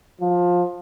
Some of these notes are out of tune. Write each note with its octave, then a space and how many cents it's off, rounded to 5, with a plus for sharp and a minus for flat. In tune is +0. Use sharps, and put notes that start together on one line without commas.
F3 +20